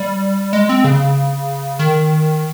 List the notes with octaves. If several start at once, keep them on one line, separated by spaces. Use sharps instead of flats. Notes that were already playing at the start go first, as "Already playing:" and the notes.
Already playing: G3
G#3
C4
C#3
D#3